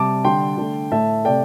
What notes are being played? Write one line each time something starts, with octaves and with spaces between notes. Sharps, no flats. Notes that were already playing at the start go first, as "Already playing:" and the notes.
Already playing: C3 G3 A5 D6
D3 G3 G5 C6
D3 A3
A2 A3 E5 A5
C3 A3 D5 G5